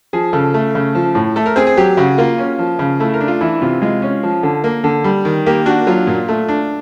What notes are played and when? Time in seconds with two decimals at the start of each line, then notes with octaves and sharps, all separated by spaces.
0.13 F3 G#4
0.33 C#3 A4
0.54 A3
0.75 C#3
0.95 F3
1.15 A2
1.36 A3 A4
1.46 A#4
1.56 C4 G#4
1.67 G#4
1.77 F#3 G4
1.97 C#3 F#4
2.18 A#3 F4
2.38 C#4
2.59 F3
2.79 C#3
3.00 A3 E4
3.14 A#4
3.20 D4
3.28 F4
3.41 E3 E4
3.62 C3 F4
3.82 G#3 F4
4.02 C#4
4.23 F3
4.43 D3
4.64 A#3
4.84 D3
5.04 G3
5.25 D#3
5.46 A#3 G4
5.66 D4 F#4
5.87 F#3 F4
6.07 A#2
6.28 A3
6.48 D4